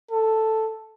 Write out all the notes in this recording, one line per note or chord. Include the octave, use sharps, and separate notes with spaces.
A4